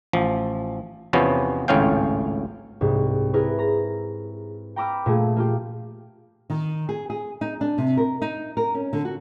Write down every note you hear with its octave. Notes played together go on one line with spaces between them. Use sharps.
A1 F3
E2 C3 F3 B3 C#4
G#1 C#2 A2 C#4 F5 G5
C2 G#2
E4 G#4 A#4 B4
A#5 A#6
G5 A#5 B5 D6 E6 F6
A#2 A3 G#4
A#3 F4 G4
D#3
G#4
G#4
D#4
D4
C3
A#4
D#4
A#4
C#4
D3
F#4